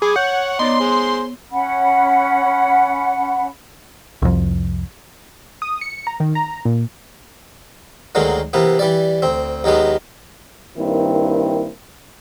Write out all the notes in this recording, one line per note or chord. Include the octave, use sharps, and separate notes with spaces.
G#4 B5 D6
C#5 F#5 G6
B3 D#4 C#5 D5 C6
G#4 C5
C#4 F#5 B5
C2 F2
D#6
C#7
A#5
D#3
A#5
A#2
D2 D3 D#3 F#3 G#3 A#3
C3 E3 A#3 B3
E3 G3 D5
D2 C4
D#2 D#3 F#3 G#3 B3
G2 D#3 A#3 C4 E4